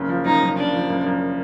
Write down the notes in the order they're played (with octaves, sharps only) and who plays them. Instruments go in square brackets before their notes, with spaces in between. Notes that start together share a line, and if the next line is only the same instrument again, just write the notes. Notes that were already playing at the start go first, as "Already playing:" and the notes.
Already playing: [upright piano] F#1 C#3
F3
[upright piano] F#2 [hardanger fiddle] D#4
[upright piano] F#2
[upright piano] C#3 [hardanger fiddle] D4
[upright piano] F3
F#2
F#2